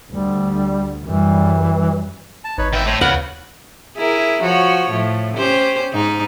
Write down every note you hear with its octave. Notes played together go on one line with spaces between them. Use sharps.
D2 G3
F#2 E3 G3
A5
G#1 D#4 B4 C#5
B2 D#4 B4 E5 G5
A2 C5 C#5 E6
D#2 C#3 B4 F#5 F6 F#6
E4 G#4 A#4
F3 F#4 C#5
A2 F3
C#4 G4 C5
G#2 D#4